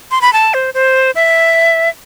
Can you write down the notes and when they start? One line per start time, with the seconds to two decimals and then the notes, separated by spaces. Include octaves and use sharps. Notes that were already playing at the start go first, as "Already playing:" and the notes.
0.11 C6
0.21 B5
0.33 A5
0.54 C5
0.74 C5
1.15 E5